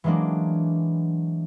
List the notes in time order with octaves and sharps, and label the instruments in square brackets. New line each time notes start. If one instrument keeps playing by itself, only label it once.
[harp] E3 F#3 G#3 A#3 D4